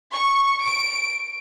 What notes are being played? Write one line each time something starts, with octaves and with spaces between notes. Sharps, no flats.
C#6
D7